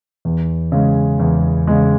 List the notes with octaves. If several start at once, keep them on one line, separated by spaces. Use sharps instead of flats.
E2
C#3 G#3
E2
C#3 G#3